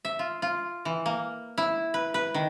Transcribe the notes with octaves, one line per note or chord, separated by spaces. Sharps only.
E5
F4
F4
E3
A#3
E4
B4
B4
D#3